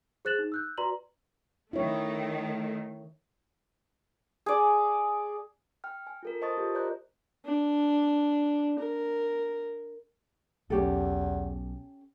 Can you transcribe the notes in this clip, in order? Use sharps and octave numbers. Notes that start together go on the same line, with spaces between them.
G#4 C5 F#6 A6 E7 F#7
D#4
E6 F#6 G6
F#4 B4 D5 A#5 C6 F#7
D#3 A3 E4 C#5
G#4 D5
G5 F6
G#5
F4 A4 A#4
C5 D#5 A5 C#6 D#6 A6
F4 G4 A#4
C5 D5 D#5 A#5 F#6 G6
D4
A#4
B1 E2 C#4 G4 A4